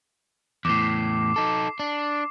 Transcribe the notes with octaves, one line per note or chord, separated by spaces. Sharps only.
E2 A2 D6 C7
D#4 A4
D4